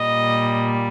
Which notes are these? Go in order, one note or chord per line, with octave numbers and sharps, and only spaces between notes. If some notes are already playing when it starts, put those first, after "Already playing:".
Already playing: A#2 G3 D#5